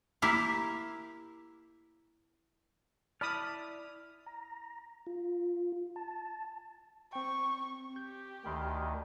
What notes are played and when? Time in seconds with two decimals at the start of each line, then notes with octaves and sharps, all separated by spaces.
0.22 A#3 E4 G4 E5 F5
3.21 E4 D5 A5 B5 D#6 F6
4.26 A#5
5.06 F4
5.96 A5
7.13 C4 G5 C#6
7.96 G4 G6
8.45 D2 D#3 G5 B5 C6